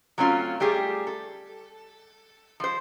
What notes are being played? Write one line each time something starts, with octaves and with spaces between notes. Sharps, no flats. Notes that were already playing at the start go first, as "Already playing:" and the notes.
F#3 A3 C4 C#4 F4
G3 A3 G4 G#4
A4
F3 C5